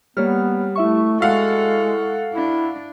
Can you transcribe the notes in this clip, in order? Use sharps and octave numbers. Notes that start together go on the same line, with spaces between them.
G3 A#3 B3 C#5 F6
A3 E4 E5 C#6
G#3 F#4 A4 F5 F#5
D4 E4